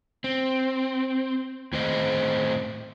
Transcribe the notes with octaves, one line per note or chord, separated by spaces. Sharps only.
C4
A2 D#3 C4 C5 D#5